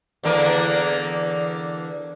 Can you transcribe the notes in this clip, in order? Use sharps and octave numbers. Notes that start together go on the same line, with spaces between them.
E2 D3 A#3